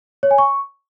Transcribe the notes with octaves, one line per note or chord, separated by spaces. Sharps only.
C#5
G#5
C#6